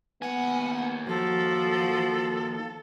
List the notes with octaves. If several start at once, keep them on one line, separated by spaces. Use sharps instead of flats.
D#2 B3 F#5 G#5
F3 F#4 A4